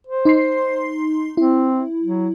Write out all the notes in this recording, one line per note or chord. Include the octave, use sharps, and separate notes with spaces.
C5
D#4 C6 C7
C4 E4
F#3